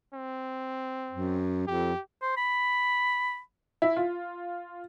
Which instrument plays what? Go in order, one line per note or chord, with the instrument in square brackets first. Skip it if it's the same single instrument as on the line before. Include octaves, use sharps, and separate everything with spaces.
[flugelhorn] C4
[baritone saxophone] F#2
[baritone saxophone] F2 [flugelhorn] G4
[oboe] C5
B5
[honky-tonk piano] E4
F4